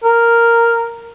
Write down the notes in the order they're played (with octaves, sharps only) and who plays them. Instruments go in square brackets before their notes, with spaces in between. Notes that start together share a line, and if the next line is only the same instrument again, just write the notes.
[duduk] A#4